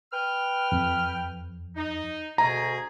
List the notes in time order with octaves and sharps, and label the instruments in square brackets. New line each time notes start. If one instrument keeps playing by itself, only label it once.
[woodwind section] B4 G5 F6
[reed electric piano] F2
[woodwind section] D#4
[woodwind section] D2 B2 G#4 [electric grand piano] A#5